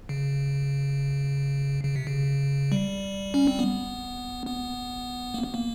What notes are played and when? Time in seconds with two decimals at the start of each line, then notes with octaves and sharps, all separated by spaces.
0.09 C#3
1.84 C#3
1.96 C3
2.07 C#3
2.72 G3
3.34 C#4
3.47 C4
3.59 B3
4.47 B3
5.34 A#3
5.44 B3
5.54 A#3